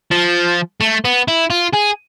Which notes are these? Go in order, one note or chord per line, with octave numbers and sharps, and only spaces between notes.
F3
A3
B3
E4
F4
G#4